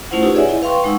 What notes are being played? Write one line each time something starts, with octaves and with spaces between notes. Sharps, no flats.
A3 C#4 E4 F4 C5 F#5
C#4 D#4 F4 G4 B4 E6
G#4 C#5 D5 E5 F#5 G#5
E4 D#5
B4 F5 G5 C6 C#6
G#3 D#4 F#5 C#6 E6